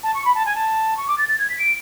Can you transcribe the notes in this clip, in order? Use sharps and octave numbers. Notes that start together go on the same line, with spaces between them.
A5
C#6
B5
A5
G#5
A5
C#6
D6
A6
A6
G#6
B6
D7